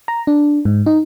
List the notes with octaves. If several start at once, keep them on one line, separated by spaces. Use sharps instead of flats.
A#5
D4
G#2
D#4